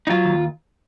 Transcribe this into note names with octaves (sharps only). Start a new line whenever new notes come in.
D#4
F#3 F4
D#2